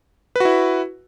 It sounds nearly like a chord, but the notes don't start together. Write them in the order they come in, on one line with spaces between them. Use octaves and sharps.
B4 F#4 E4